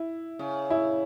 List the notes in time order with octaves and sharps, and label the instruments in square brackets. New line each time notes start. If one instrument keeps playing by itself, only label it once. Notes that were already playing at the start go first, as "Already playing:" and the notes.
Already playing: [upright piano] E4
[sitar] C#3
[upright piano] E4